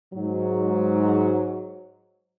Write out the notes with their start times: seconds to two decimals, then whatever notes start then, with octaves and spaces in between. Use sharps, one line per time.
0.14 G#2 F#3